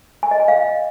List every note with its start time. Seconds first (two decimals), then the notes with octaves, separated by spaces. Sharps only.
0.23 G#5
0.31 D#5
0.40 G#5
0.48 F5